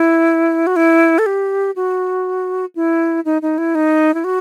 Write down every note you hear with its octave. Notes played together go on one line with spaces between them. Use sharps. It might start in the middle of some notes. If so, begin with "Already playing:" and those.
Already playing: E4
F#4
E4
A4
G4
F#4
E4
D#4
D#4
E4
D#4
E4
F#4